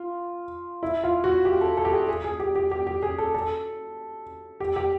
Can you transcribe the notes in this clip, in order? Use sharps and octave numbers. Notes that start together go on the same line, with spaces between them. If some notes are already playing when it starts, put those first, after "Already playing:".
Already playing: F4
E4
F4
F#4
G4
A4
A4
G4
G#4
G#4
G#4
G4
G4
G4
G4
G#4
A4
A4
G4
G4